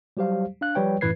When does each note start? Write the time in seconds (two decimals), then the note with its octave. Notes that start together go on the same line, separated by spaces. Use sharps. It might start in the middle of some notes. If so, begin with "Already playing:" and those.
0.17 F#3 G3 G4 C5 F5
0.61 D4 F5 F#6
0.75 F3 G3 B4 C#5 G5
1.01 F#2 A2 E3 B4 G#6 C7